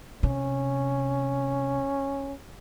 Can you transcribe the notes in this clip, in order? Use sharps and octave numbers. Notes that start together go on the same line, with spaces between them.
C3 C#4